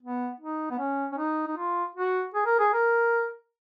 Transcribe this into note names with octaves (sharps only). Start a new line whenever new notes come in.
B3
D#4
B3
C#4
C#4
D#4
D#4
F4
F#4
G#4
A#4
G#4
A#4